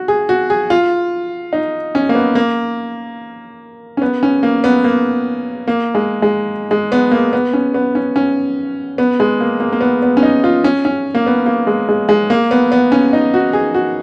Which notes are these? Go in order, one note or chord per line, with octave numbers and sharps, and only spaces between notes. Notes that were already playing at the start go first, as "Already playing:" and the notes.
Already playing: F#4
G#4
F#4
G#4
F4
D#4
C#4
A#3
B3
A#3
C#4
B3
C#4
A#3
B3
A#3
A#3
G#3
G#3
G#3
B3
A#3
B3
C#4
B3
C#4
C#4
B3
G#3
A#3
A#3
A#3
B3
B3
C#4
D#4
F4
C#4
C#4
A#3
B3
A#3
G#3
G#3
G#3
A#3
B3
B3
C#4
D#4
F#4
G#4
F#4